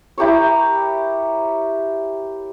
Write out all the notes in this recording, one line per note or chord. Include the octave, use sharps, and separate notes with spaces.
E4 G4 A#4 C#5